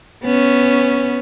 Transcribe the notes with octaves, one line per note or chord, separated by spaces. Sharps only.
B3 C#4